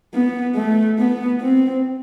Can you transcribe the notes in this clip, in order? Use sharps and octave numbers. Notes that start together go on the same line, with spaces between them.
B3
A3
B3
C4